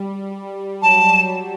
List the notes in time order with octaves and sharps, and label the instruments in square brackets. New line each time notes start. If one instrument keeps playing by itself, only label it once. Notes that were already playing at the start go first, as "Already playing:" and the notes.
Already playing: [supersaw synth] G3
[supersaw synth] F#3 [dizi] A5
[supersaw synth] G3